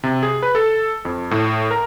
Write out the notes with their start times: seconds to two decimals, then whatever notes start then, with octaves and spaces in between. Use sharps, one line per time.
0.03 C3
0.23 G#4
0.42 B4
0.55 A4
1.05 F2
1.31 A2
1.71 A#4